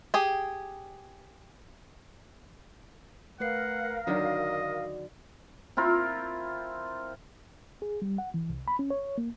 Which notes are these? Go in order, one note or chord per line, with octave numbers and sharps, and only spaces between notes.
G4 G#4
A3 A#4 B4 F5 F#5 C7
D3 D#3 F#3 F#4 D5 D#5
C4 E4 F4 A#4
G#4
G3
F#5
E3
C2
B5
C#4
C#5
A#3